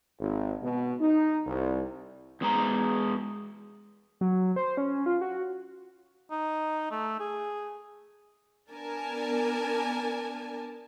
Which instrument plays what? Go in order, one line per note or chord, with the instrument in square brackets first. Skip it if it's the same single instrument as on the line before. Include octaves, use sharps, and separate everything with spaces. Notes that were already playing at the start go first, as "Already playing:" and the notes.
[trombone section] G#1
B2
D#4
C2
[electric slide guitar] E2 G#3 A#5
[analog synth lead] F#3
C5
C#4
F4
F#4
[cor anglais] D#4
A3
G#4
[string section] B3 D4 A#4 G#5 A5